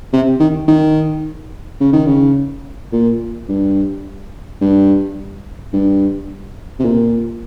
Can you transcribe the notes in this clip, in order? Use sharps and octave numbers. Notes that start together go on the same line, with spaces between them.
C3
D#3
D#3
C#3
D#3
C#3
A#2
G2
G2
G2
C3
A#2